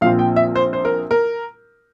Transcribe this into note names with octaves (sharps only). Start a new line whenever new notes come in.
A#1 A#2 F3 C4 F5
G5
E5
C5
C5
A#4
A#4